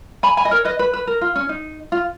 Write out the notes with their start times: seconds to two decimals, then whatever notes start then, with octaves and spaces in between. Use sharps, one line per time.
0.23 G#5 B5
0.37 G#5 B5
0.45 D#5
0.51 A#4 C#5
0.65 B4 D#5
0.79 B4
0.93 B4
1.07 A#4
1.21 F4
1.36 C#4
1.49 D#4
1.92 F4